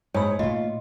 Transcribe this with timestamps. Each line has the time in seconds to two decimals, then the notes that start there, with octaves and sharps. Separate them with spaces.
0.14 G#2 D#4 C#5 B5 E6
0.39 A#2 A3 F4 D#5